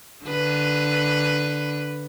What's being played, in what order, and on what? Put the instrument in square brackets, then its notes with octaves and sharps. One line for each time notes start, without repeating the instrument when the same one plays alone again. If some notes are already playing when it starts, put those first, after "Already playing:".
[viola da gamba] D3 B4